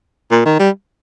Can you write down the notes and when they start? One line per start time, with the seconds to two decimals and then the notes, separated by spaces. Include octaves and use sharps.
0.31 A#2
0.45 D#3
0.59 G3